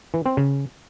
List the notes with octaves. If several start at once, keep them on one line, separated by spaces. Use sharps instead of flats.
E3
C4
C#3